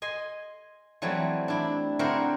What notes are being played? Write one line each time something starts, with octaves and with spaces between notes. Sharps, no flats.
D#5 G#5 C6
E3 F#3 G3 A3 C4
D4 E4
D3 C4 E4 F#4 A#4 C5